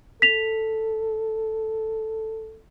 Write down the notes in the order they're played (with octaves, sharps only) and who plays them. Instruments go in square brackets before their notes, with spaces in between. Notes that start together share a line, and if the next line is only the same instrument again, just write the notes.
[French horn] A4 [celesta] B6 F7